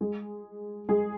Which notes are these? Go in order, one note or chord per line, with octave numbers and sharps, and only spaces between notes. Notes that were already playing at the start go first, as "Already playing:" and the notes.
G#3 G#4
G#3 G#4